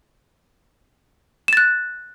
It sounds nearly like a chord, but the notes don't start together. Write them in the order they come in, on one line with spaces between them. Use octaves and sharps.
E7 A6 F#6